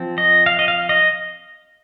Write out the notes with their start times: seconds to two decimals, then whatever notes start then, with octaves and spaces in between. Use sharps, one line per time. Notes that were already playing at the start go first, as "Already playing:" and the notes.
Already playing: F3 C4
0.18 D#5
0.46 F5
0.59 D#5
0.68 F5
0.89 D#5